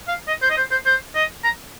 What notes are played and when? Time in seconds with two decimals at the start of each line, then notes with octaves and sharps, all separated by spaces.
0.08 F5
0.28 D#5
0.42 C5
0.50 D#5
0.57 C5
0.71 C5
0.86 C5
1.15 D#5
1.44 A#5